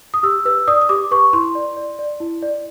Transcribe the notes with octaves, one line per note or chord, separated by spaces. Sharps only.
D#6
G4 E6
B4 E6
D5 D#6
D#6
G4 D6
B4 C#6
E4 C6
D5
D5
D5
E4
D5